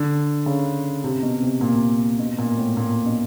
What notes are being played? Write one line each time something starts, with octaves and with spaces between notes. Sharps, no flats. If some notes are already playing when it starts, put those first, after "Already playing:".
Already playing: D3
C#3
C3
B2
C3
A#2
B2
A#2
A2
A#2
B2